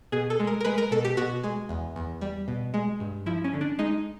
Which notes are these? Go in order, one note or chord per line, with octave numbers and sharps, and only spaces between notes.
B2 G#4
A4
G#3
A#4
A#4
G#3 B4
A#4
B2 A4
G4
B2 F#4
G#3
E2
E2
G3
B2
G#3
G2
F3 E4
C#4
D3
D4
G#3 D#4